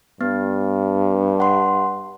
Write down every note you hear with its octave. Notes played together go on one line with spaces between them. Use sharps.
G2 B3
F#5 C6